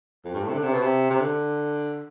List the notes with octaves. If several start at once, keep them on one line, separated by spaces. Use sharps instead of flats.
F2
G2
A2
C3
D3
C3
B2
C3
C3
D3